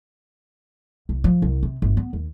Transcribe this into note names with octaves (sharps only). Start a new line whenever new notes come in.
C2
F3
C2
C3
G1
B3
D#2